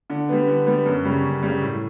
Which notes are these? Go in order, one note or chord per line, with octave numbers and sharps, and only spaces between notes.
D3
G3 B3
D3
G3 B3
F#2
C#3 G3
F#2
C#3 G3
A2